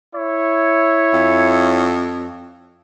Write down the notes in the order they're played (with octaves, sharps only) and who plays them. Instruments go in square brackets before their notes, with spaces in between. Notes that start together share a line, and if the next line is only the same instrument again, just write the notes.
[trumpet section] E4 C#5
[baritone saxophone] F2